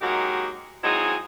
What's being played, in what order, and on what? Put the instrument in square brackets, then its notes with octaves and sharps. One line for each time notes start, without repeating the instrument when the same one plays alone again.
[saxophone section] F#3 G#3 A#3 D#4 F#4 G4
F#3 G#3 C4 D#4 E4 G#4